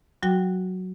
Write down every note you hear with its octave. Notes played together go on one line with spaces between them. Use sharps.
F#3 F#4 G5